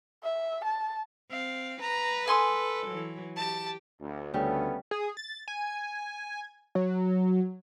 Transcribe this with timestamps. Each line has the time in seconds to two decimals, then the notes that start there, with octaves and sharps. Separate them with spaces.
0.24 E5
0.64 A5
1.31 C4 F5
1.81 B4 A#5
2.28 A4 G#5 C6 D#6
2.87 E3 F#3
3.37 G4 A5
4.00 D2
4.34 D2 C#3 G3 A3 B3 C#4
4.91 G#4
5.17 A6
5.48 G#5
6.75 F#3